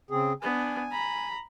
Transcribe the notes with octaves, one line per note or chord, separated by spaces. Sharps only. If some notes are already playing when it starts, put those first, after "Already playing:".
C#3 C4 G#4
B3 D4 G#5
A#5 B5